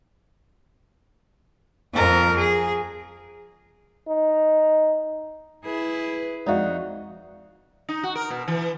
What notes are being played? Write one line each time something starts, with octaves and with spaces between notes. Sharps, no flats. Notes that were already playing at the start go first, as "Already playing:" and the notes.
F2 A#4
G#4
D#4
E4 G#4 B4
F2 G#3 D#4 F#4 D5 E5 F5
D#4
F#4
A#4
B2
E3